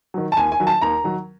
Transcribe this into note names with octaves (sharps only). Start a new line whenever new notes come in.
D#3 F#3
A5
D#2 G#5
G#5
D#3 F#3
A5
D#2 A#5
D#3 F#3